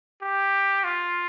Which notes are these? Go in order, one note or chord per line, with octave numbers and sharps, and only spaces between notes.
G4
F4